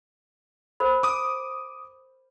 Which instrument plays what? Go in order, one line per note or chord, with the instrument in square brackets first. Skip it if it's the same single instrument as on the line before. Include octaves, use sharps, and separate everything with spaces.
[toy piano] A#4 C5 B5
[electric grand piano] D6 D#6